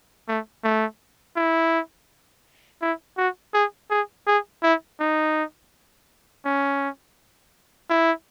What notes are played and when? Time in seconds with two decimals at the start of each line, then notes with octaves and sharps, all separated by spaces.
0.28 A3
0.64 A3
1.36 E4
2.82 E4
3.17 F#4
3.54 G#4
3.90 G#4
4.27 G#4
4.63 E4
5.00 D#4
6.45 C#4
7.90 E4